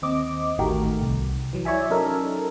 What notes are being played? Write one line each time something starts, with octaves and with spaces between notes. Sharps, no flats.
D#2 C4 D#5 D6
A1 D#3 A3 F#4 G4 A#4
C2
E3 F#3
E4 C#5 D5 E5 G#5
F#3 C#4 D#4 A4 A#4